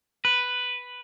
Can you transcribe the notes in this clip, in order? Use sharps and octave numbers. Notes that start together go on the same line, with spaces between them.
B4